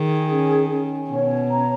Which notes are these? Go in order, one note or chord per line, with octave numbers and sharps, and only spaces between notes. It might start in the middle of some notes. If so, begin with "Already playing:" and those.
Already playing: D#3 G#4
C#4
C#4
B2 C#5
A#5